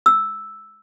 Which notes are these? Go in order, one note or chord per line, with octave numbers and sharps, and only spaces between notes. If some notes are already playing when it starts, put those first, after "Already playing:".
E6